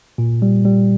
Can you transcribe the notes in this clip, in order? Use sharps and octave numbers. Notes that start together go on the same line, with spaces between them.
A#2
G3
G3